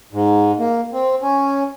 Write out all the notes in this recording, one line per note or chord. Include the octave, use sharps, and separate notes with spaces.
G#2
A#3
C4
C#4